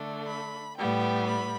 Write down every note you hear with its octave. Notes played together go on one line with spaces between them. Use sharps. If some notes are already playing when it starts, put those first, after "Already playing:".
Already playing: D3 A3 D4
B5
A2 G3 B3 G5
B5